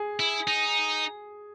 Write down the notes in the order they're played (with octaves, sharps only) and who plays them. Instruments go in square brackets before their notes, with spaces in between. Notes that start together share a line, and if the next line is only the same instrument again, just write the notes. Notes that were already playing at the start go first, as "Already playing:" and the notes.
Already playing: [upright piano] G#4
[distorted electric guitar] E4
D#4